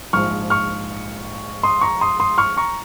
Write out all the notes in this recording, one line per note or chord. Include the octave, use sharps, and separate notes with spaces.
A#1 G#2 F3 C#6 F6
C#6 F6
C6 D#6
A#5 C#6
C6 D#6
C6 D#6
C#6 F6
A#5 C#6